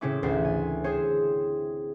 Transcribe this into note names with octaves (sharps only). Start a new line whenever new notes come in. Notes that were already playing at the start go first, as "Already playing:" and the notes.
A2 C#3 C4 C#4 E4 D6
A1 D2 C4 C5
G#5
C4 G#4 C5 C#5